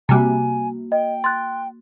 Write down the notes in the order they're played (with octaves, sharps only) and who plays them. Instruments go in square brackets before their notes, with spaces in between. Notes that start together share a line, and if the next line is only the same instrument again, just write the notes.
[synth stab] C3 G3 [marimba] A#3 F#4 [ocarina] G#5
[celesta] D#5 [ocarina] G5
[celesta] C6 F#6 [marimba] A6